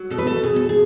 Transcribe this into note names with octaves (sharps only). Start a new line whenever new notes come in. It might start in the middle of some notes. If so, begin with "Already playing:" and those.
Already playing: F#3
B2 A4
B4
A4
B2 G#4
A4
G#4